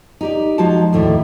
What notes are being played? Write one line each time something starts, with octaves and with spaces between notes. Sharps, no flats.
D#4 G4 D5
F3 G#3 D#4 F#4 A5
D#2 A2 D3 E3